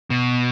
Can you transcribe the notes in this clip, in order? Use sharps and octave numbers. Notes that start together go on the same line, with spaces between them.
B2